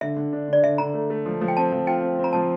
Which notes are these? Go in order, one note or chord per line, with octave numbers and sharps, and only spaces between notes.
D3 E5
D3
D4
D3 D5
D3 E5
D3 A#5
A3
A3
F3
F3
G5
C4 A5
F3
F4 G5
C4
C4
A#5
F3 A5